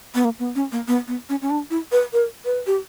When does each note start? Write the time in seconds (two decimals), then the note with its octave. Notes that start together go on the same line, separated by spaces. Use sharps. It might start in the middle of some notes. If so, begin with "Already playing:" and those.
0.15 B3
0.25 A#3
0.39 B3
0.55 C#4
0.72 A#3
0.88 B3
1.08 B3
1.29 C#4
1.42 C#4
1.50 D4
1.70 E4
1.92 B4
2.13 A#4
2.45 B4
2.67 G4